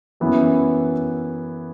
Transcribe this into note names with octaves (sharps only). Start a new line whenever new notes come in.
F#2 E3 B3 E4